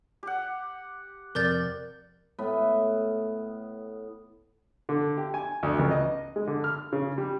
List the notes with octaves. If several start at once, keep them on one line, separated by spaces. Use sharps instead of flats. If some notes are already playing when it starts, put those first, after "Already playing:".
G4 F#5
F2 C3 A#4 D5 G6 A6
A2 B3
D3
G4
G#5
D2
C#2
D#5
G#3
D3
F6
C#3
G3